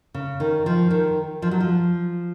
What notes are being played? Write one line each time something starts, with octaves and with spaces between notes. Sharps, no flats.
C#3
D#3
F3
D#3
F3
F#3
F3